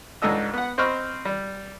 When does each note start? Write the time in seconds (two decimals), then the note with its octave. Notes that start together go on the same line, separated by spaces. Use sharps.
0.22 C#2 G#2 D4 A4 D#5 E6
0.54 B3 F#5
0.78 C4 C5 D#5 B5 C#6 F6
1.25 G3